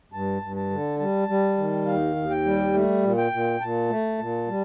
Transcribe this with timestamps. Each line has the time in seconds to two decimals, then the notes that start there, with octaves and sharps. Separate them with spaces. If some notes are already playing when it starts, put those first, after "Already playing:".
0.12 G2 A5
0.42 G2
0.56 A5
0.70 D3
0.99 G3 A5
1.28 G3
1.58 D#3
1.86 D#2 F5
2.16 D#2
2.30 G5
2.45 G3
2.74 A3
3.03 A#2
3.17 G5
3.32 A#2
3.60 A#2 A5
3.90 A3
4.19 A#2
4.48 G3